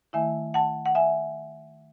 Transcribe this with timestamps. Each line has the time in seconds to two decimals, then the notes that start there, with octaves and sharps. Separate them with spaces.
0.13 D#3 A3 E4 E5 G#5
0.54 F#5 A5
0.86 F#5
0.95 E5 G#5